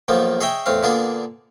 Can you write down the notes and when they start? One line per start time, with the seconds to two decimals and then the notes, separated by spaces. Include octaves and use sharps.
0.08 B1 D#3 F3 A#3 B3
0.41 G#4 C#5 D#5 E5 G5
0.66 E2 A2 C4 F5
0.83 A#2 D3 A#3 B3 D4 G#4